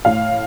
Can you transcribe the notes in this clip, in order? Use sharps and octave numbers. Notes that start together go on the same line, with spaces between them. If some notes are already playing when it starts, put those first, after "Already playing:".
A2 F5